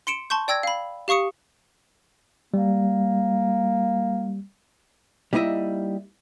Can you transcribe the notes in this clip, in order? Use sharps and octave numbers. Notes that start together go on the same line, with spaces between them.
C6 C#7 D7 E7
A5 C6 C#6 G6
D5 G5 E6 G#6 A#6
F5 B5
G4 F5 C#6 D#6 C#7
G3 A#3
G3 A#3 D#4 E4 D#5 E5